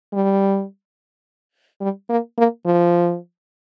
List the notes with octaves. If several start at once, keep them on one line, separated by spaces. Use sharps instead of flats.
G3
G3
A#3
A#3
F3